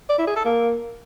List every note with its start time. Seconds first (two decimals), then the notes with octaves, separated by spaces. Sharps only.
0.10 D5
0.19 E4
0.27 G#4
0.36 A4
0.45 A#3